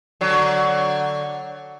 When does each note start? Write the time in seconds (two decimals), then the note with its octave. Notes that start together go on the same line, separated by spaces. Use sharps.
0.21 D3 F#3